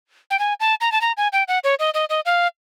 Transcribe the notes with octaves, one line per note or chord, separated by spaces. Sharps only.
G5
G#5
A5
A#5
A5
A#5
G#5
G5
F#5
C#5
D#5
D#5
D#5
F5